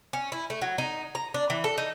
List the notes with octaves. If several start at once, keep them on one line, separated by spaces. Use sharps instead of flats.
C#4
E4
A3
F#3
D#4
A#5
D4
E3
A4
D#4